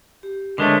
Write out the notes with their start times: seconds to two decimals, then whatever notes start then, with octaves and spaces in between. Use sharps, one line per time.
0.23 G4
0.58 D3 G#3 A3 A#4 B4 C#5